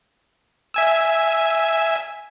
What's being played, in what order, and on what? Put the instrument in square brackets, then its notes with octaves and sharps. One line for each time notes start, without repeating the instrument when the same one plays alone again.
[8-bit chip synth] E5 G#5 E6